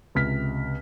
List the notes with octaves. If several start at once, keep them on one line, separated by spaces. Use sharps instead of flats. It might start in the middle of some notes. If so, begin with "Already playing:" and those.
C#2 C3 F6 B6